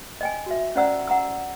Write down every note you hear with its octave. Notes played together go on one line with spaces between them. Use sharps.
D#5 G5 G#5
F#4 E5
C#4 C5 D5 F#5 A#5 E6
F#5 A#5 E6